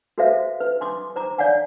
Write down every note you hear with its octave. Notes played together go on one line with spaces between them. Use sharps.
F#4 A4 B4 C5 E5 F5
B4
G#5 C6 D6 D#6
C5 A#5 D6
C#5 D5 F5 F#5 G#5